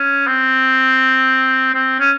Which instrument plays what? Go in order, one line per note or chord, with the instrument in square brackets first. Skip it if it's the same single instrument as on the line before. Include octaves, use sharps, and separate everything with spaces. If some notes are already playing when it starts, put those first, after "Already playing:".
Already playing: [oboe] C#4
C4
C4
C#4